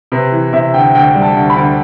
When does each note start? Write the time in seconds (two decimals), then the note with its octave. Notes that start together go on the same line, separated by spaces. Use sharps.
0.12 C3 B4
0.32 E3
0.53 C3 E5
0.74 D2 G5
0.95 D2 G5
1.14 G3
1.22 A5
1.36 D2
1.50 B5
1.56 D2